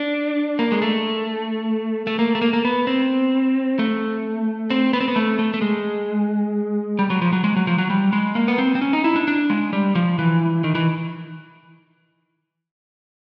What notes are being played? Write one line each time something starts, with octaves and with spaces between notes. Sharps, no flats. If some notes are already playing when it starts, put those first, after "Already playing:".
Already playing: D4
A#3
G#3
A3
A3
A#3
A3
A#3
A#3
B3
C4
A3
C4
B3
C4
B3
A3
A3
A3
G#3
G3
F#3
F3
F#3
G#3
F#3
F3
F#3
G3
G#3
A#3
B3
C4
C4
C#4
D#4
E4
D4
D4
G#3
G3
F3
E3
D#3
E3